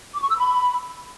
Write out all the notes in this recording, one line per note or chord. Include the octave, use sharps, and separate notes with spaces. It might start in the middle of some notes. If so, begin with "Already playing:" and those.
D6
C#6
E6
B5